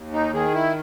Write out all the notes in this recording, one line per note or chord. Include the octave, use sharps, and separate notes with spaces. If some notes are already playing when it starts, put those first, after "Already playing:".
Already playing: D#2
D#4
D#3 G#4
E4